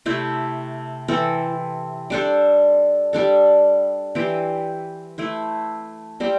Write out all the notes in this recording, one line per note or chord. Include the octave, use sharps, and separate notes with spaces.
C3 A3 E4 C5
E3 C4 A4
G3 D4 A4 C5
G3 D4 A4
E3 C4 G4 C5
A3 E4 C5
G3 C4 G4 C5